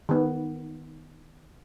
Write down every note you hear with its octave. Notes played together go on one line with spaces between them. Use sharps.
D#3 B3